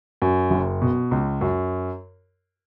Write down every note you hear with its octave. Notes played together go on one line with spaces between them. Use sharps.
F#2
F#1
B2
C#2
F#2